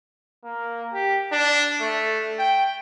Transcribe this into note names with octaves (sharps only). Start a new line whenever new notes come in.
A#3
G4
D4
A3
G5